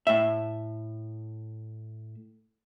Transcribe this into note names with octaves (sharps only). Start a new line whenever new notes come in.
A2 E5